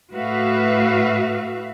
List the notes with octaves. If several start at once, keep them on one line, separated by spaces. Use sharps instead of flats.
A2 F#4 B4 E5 F5